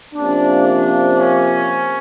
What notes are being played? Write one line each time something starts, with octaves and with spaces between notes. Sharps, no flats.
C3 F3 A#3 C#4 D4
D4
C#4